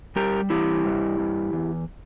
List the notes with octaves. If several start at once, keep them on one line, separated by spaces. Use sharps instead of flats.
G3 G4 A#4
E3 E4 G4
G2
G2
E2